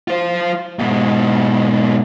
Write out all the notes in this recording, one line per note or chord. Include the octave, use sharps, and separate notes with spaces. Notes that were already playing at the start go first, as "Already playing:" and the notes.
F4 C5
G#2 B2